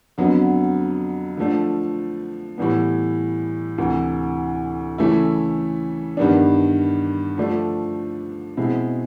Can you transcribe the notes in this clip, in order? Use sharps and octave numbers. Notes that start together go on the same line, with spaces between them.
F2 D3 F#3 B3
D3 F3 A3 D4
A2 E3 G3 B3
D2 C3 E3
C#3 E3 A3 C#4 E4
G2 D#3 G3 B3 D4
D3 F3 A3 D4
B2 G#3 C4 E4